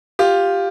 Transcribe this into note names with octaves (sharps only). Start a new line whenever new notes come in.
F4 G4